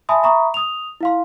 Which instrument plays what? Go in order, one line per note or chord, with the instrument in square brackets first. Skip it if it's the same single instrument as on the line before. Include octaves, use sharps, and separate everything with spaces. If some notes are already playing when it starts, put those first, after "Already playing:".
[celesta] E5 G#5 A5 B5 C6 D#6
E5 A#5 B5 C#6 D#6
D#6 F7
E4 F5 C6